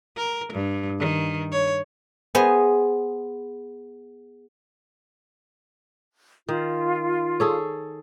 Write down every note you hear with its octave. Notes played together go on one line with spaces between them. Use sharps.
A#4
G2
D#3
C#5
B3 G#4 C5 D#5
D#3 F4
G#4 A4 C#5